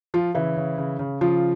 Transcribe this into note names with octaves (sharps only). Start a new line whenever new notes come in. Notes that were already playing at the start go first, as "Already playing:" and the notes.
F3 F4
C#3 E3 E4
C#3
C#3
C#3
C#3 F3 F4